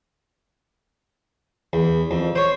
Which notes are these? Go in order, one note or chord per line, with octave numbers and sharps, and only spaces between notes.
E2
F2
C5 C#5